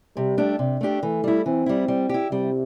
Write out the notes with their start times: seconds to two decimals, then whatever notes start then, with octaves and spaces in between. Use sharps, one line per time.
0.17 C3 G3
0.38 A3 D4 G4
0.59 C3
0.81 A3 D4 G4
1.02 E3 A3
1.24 G3 E4
1.46 E3 C4
1.66 G3 E4
1.88 G3
2.09 E4 G4
2.32 C3 G3